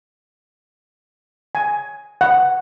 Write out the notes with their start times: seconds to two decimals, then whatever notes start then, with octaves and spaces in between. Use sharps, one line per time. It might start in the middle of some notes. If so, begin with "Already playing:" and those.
1.55 G#5
2.21 F#5